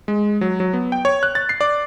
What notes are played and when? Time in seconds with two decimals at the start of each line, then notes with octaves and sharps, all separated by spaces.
0.08 G#3
0.41 F#3
0.60 F#3
0.73 B3
0.92 G5
1.05 C#5
1.23 F#6
1.35 A6
1.49 C7
1.61 D5